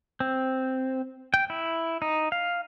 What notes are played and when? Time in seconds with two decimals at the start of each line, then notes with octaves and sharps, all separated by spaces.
0.20 C4
1.34 G5
1.50 E4
2.02 D#4
2.32 F5